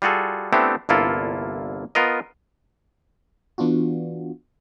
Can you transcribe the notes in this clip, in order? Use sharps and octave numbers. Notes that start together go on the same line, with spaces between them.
G3 F4 F#4 G#4 A4
A3 B3 C4 D4 E4 G4
G1 C2 A#3 E4 F4 A4
B3 F4 A#4 D#5
E3 B3 D4 F4 F#4